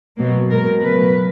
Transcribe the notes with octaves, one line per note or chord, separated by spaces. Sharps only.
B2 F#3 A#3
B2 G#3 A#4
C#3 F#3 A3 B4